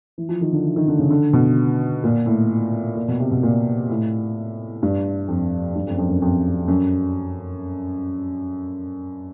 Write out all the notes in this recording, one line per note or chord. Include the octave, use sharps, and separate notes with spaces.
E3
F3
D#3
D3
E3
D#3
D3
C#3
D3
B2
A#2
A2
A#2
B2
C3
B2
A#2
A2
G2
F2
G2
F2
F#2
F2
F#2
F2
F#2